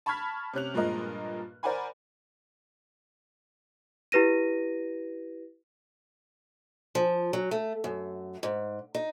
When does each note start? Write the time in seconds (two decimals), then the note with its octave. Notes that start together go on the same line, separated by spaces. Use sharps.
0.06 A5 B5 C#6 F6 G#6 B6
0.53 C3 C#4 F#6 F7
0.74 G2 A#2 F3 G#3 A#4 D#5
1.63 A#4 C5 D5 F#5 G#5 B5
4.12 E4 G4 B4 A#6 D#7
6.95 F3
7.33 F#3
7.51 A3
7.84 F#2
8.43 G#2
8.95 D#4